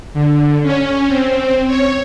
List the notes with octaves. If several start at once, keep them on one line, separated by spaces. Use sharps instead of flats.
D3
C#4
C4
C#5